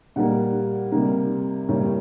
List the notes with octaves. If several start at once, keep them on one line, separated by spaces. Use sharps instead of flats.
A#2 G3 A#3 F#5
C3 G3 A#3
A2 G3 A#3